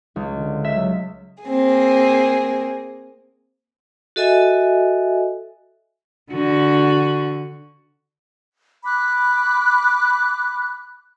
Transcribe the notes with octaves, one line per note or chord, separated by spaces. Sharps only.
C#2
D3
E5
F#3
A#3 C4 G#4
F#4 A4 D#5 E5 G#5
D3 F#4
B5 D6 F#6